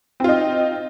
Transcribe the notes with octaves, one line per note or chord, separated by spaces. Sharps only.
C4 D#4 F4